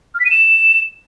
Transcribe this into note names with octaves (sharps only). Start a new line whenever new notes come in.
F6
B6
D#7
E7